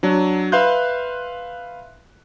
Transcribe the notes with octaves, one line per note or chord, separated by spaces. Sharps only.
F#3 D4
B4 E5 F5 C6 F#6 G6